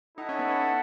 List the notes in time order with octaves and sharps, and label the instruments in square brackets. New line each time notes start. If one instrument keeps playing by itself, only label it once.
[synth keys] D#4 [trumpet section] E4 A4 D#5 F#5
[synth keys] C#4
B3
C#4